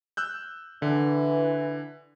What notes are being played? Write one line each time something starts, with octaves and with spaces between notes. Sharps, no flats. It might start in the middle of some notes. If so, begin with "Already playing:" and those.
E6 F#6 G6
D3 E3